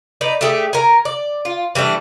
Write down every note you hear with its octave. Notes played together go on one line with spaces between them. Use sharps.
D#4 B4 D5
A3 G4 G#4
A#4 G#5
D5
F4
E3 G3 A3 D4